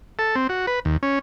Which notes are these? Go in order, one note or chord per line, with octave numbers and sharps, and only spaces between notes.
A4
C4
F#4
B4
D#2
C#4